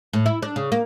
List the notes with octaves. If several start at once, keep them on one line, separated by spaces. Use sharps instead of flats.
A2
E4
D4
C#3
A#3